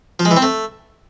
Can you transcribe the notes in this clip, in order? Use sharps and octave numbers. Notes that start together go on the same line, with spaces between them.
F3
G#3
E3
C4
A3